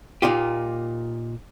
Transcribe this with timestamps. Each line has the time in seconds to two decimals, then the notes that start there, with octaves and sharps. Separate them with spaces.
0.22 A#2 D#4 F4 G4